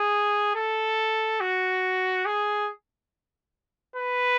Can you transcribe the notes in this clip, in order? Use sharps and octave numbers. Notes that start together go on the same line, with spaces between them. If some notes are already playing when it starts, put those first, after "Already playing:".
Already playing: G#4
A4
F#4
G#4
B4